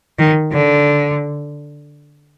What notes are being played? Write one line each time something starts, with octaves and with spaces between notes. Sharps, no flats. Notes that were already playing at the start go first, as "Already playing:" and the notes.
D#3
D3